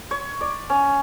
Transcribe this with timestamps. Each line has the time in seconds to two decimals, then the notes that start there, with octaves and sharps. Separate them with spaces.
0.11 C#5
0.41 D5
0.70 C#4